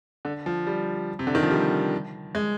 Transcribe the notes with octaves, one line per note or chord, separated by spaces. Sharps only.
D3
F3
G3
C3
D3
D#3
F3
G3
G#3